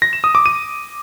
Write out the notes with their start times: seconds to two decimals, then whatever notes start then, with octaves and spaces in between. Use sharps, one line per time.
0.02 A#6
0.13 E7
0.24 D#6
0.35 D6
0.46 D#7